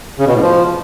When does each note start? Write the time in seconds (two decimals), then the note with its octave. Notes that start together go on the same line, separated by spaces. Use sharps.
0.18 C#3
0.26 B2
0.34 A2
0.42 F3